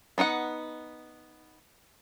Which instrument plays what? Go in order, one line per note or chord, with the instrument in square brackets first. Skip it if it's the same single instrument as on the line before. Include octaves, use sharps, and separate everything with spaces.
[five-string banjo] B3 D#4 F5 F#5